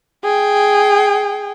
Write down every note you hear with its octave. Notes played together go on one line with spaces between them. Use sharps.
G#4 G5